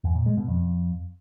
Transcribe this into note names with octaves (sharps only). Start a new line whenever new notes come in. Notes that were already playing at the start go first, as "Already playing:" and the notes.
E2
A#2
G#3
B2
F2